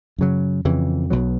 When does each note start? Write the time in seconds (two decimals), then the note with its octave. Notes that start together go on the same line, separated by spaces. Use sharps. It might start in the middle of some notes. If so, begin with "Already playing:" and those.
0.18 F#2 C#3 F#3
0.65 F2 C#3 E3
1.10 B1 B2 F#3